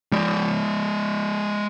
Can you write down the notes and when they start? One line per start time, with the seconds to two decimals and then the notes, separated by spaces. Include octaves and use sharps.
0.12 G#3 D5